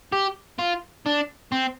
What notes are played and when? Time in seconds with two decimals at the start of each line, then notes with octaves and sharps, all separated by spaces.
0.12 G4
0.59 F4
1.06 D4
1.52 C4